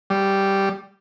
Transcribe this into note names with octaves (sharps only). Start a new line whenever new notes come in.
G3